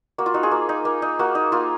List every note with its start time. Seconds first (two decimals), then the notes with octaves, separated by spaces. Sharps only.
0.18 A#3 F#4
0.26 F4
0.34 D#4 F#4
0.43 F4 G#4
0.51 A#3
0.69 D#4
0.85 A#3
1.02 D#4
1.19 A#3 F#4
1.35 D#4
1.52 A#3 F4